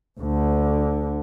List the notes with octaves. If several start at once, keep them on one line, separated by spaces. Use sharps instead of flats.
D2 D3